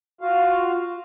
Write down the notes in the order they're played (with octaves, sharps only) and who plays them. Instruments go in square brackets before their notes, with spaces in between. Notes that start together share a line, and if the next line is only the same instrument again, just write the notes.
[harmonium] F4 F#4 F5